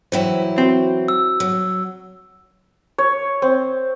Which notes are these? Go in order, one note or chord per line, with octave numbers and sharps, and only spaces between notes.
E3 F#3 E4 C5 G5
C4 F#4
E6
F#3
C#5
C4